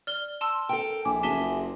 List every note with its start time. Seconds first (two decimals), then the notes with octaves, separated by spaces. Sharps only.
0.07 D5 F6 G7
0.41 A5 C6 E6
0.69 A4 A#4 G5
1.05 A#1 E4 G#5 D6
1.23 F#1 F4 G#4 E5 A5 B6 G7